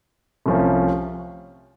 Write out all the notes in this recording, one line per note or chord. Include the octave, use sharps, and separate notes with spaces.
C2 C3 F3 A3 C#4